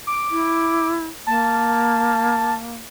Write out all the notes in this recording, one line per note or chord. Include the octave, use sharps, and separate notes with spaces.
D6
E4
A#3 A5